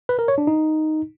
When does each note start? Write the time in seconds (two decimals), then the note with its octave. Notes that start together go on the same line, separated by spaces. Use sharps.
0.09 B4
0.19 A#4
0.28 C#5
0.38 D4
0.47 D#4